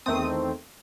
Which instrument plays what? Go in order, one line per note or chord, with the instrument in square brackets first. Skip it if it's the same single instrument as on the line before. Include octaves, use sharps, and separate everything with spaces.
[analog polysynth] E2 D#3 A3 C4 D#6